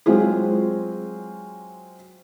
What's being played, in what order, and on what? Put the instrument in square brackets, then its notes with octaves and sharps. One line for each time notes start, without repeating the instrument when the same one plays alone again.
[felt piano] F#3 G#3 C4 F4 G#4